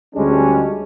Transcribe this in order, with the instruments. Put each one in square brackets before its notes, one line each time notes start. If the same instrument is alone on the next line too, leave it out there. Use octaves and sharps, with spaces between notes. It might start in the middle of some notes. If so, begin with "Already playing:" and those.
[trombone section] D2 G3 G#3 C#4 D4